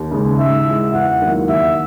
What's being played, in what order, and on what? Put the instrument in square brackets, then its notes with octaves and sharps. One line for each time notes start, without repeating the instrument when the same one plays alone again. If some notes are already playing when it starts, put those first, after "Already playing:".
Already playing: [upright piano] D#2
C#3 G#3
[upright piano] G#2 [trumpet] E5
[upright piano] E3 G#3
[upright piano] E2 [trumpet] F#5
[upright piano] D#3 F#3 A#3 E4
[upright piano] D#2 [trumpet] E5